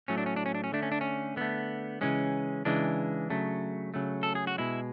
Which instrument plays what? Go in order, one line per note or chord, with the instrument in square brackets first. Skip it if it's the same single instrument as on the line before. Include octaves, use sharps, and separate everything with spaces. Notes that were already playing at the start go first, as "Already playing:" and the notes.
[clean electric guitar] A2 F#3 A3 C#4
D4
C#4
D4
C#4
D4
C#4
D3 A3 D4
C#4
D4
C#4
D3 A3 B3
C#3 E3 G#3 C#4
C#3 E3 G#3 D4
C#3 F#3 A3
C#3 F#3 A3
A4
G#4
F#4
B2 G#3 E4